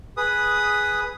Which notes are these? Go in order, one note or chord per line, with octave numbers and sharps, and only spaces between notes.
G#4 B4 D#6